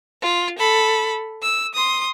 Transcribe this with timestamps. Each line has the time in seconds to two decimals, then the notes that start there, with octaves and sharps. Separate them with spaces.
0.22 F4
0.58 A4 B5
1.42 E6
1.74 C6 D#6